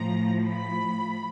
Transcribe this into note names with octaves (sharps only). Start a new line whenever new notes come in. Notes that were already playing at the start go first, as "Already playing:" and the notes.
Already playing: A2 F3 A#5
B5